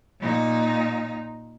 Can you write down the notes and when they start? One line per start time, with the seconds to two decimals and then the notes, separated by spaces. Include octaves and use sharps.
0.21 A#2 D#4